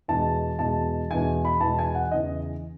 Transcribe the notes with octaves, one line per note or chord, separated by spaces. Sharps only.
E2 B2 G#3 A5
E2 B2 G#3 A5
E2 B2 G#3 G#5
B5
E2 B2 G#3 A5
G#5
F#5
E2 C#3 E3 D#5